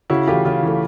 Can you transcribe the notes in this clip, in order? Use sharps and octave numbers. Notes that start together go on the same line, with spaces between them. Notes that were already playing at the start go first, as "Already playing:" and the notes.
C#3 E4 F#4
E3 A3 F4 G4
C#3 F4
E3 A3